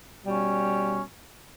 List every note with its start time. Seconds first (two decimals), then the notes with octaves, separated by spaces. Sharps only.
0.25 B2 G3 C#4